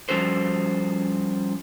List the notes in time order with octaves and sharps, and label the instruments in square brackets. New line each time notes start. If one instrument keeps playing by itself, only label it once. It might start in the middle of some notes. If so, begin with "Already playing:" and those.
[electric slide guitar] F3 G3 C#4 F#4 A4 C5